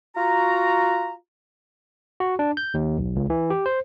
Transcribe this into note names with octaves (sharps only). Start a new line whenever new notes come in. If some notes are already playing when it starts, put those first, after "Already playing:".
F4 F#4 A#5
F#4
D4
G6
D#2
B1
C#2
E3
G4
C5